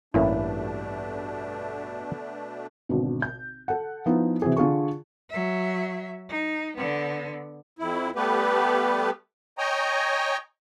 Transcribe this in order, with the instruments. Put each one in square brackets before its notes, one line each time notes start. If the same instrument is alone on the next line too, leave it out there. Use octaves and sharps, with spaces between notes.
[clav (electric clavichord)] A1 A#3 C#4 [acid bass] G2 [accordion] B2 A3 D4 [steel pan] E4
[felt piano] G#1 B2 D3
G6
A4 F#5
F3 B3 D#4 E4
C3 E3 C4 F#4 G#4
D3 F4 G#4 C#6
[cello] F#3 E5
D#4
D3 B3
[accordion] F2 E4
G3 A3 B3 G4 B4
C#5 D#5 G5 G#5 A#5